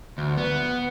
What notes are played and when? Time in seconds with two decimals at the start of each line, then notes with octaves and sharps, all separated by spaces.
0.18 D2
0.38 B3